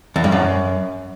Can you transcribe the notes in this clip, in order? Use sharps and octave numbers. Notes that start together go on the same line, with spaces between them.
E2
G2
F#2